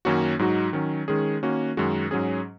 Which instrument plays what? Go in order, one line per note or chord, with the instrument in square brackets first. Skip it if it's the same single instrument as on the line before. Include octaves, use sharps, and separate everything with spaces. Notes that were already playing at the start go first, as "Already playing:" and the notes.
[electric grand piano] F#2 D#3 A#3 C#4 F#4
G#2 F#3 D#4 F#4
D#3 F#3 C#4
D#3 G#3 C#4 G#4
D#3 A#3 C#4 F#4
F#2 D#3 G#3 F#4
G#2 F#3 C#4 G#4